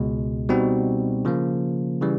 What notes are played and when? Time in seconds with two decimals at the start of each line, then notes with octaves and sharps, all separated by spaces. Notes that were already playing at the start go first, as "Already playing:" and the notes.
Already playing: C#2 B2 G#3
0.49 B2 G3 C4 D#4 F#4
1.25 C#3 F3 A#3
2.01 C#3 E3 G3